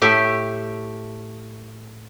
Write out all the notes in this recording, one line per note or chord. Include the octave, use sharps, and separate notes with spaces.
A2 A3 G4 E5